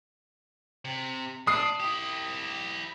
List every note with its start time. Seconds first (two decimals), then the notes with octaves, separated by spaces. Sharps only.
0.85 C3
1.47 D4 D#6 C7
1.80 E4 G4